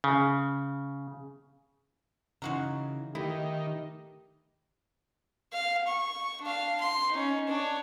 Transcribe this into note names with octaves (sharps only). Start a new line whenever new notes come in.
C#3
C#3 E3 G#3 D#4 F#4 A#4
D#3 A3 E4 G4
F5
C#6
D4 F5
C6
C#4 D#4
D4 C#5